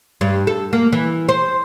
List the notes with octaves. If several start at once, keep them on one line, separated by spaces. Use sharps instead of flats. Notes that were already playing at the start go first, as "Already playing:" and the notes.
G2
A4
A#3
E3
C5